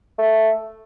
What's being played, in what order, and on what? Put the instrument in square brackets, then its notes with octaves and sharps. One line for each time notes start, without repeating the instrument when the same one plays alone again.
[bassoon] A3